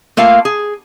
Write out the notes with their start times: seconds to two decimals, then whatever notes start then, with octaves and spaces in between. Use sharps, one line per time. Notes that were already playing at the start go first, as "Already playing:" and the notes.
0.17 A3 A#3 F4 F5
0.45 G#4